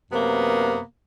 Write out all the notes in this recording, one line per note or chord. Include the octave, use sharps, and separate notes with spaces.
F#2 C3 A#3 B3